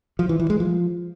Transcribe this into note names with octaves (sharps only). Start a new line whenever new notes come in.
F3
E3
E3
G#3
F3